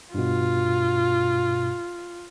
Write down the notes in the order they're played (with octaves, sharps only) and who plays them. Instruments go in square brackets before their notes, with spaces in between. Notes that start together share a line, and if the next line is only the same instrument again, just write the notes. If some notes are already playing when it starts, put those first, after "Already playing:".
[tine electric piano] G2 B2 [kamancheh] F4